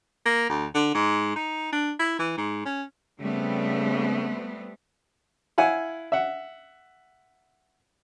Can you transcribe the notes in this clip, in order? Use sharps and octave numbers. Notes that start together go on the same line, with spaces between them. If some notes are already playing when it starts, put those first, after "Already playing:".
A#3
D2
D3
G#2
D#4
D4
E4
E3
G#2
C#4
C#3 G3 A3 B3 C4
E4 F5 F#5 G#5
E5 F#5